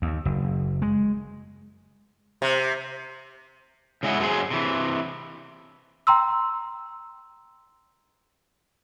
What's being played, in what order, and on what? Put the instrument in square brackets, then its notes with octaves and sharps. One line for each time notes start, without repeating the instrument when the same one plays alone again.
[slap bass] D#2
F#1
G#3
[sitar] C3
[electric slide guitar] C#3 G#3 E4 F#5
F#2 F#3 G#3 D4 G#4 C5
C3 E3
[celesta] G5 A#5 C6 E6